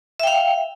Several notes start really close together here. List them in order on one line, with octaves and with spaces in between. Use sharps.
E5 G5 F5